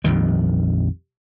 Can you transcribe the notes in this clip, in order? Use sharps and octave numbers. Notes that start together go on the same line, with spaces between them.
A#1 F2 D#3 G3